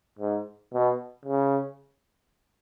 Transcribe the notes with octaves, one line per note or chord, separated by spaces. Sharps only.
G#2
B2
C#3